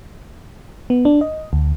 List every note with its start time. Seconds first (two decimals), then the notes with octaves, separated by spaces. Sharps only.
0.90 B3
1.05 D4
1.21 D#5
1.53 D2